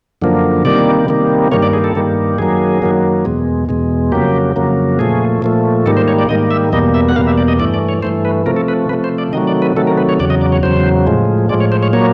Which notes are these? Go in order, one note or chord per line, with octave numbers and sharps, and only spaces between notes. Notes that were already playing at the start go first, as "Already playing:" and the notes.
F#2 D3 F3 A#3
C3 D#3 G3 A#3 D5
C3 D#3 G3 A#3
G2 D#3 G3 A#3 C#5
D5
G#4
A4
G2 D#3 G3 A#3
F#2 D#3 F#3 A#3 G#4
F#2 D#3 F#3 A#3
E2 B2 G#3
E2 B2 G#3
F2 C#3 F#3 A#3 G4
F2 C#3 F#3 A#3
A#2 F3 A3 G#4
A#2 F3 A3
G#2 D#3 G3 A#3 A4
C5
C#5
D5
G#2 D#3 G3 A#3 D#5
E5
E2 B2 G3 A#3 D#5
E5
F#5
E2 B2 G3 A#3 F5
E5
D5
D#5
G2 E3 A3 D5
D5
C#5
G2 E3 A3 C5
B4
C3 F3 A3 A#4
A4
B4
C3 F3 A3 B4
C5
D5
C3 D#3 F#3 A3 D#5
D5
B4
C3 D#3 F#3 A3 A4
A#4
B4
C#5
E2 C#3 F#3 D5
D#5
D5
C#5
E2 C#3 F#3 C5
A2 F3 G#3
A2 F3 G#3 D5
C#5
C5
C#5
A#2 F#3 A#3 C#5